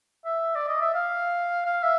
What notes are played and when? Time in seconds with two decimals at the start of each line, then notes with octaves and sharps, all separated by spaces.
0.25 E5
0.55 D5
0.68 D#5
0.81 E5
0.94 F5
1.65 F5
1.83 E5